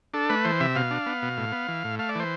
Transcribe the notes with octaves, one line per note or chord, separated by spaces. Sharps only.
D4 A4
A3 B4
E3 C5
C3 E5
B2 F5
D4
B3
B2
A2
B3
E3
A2
A3 F5
D5
E3 C5